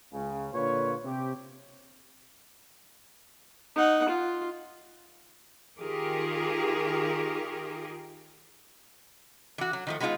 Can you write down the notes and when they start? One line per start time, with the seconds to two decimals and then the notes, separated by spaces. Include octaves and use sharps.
0.13 C#2 C#3
0.53 A#2 D3 A#3 F4 B4 C#5
1.04 C3 C4 G4
3.76 D#4 F#5
4.09 F4
5.78 D#3 F4 G4 G#4 A#4
9.58 E3 F#4
9.73 F#3
9.87 D#3 F3 A3
10.00 F#3 G#3 B3 D#4 F4 G#4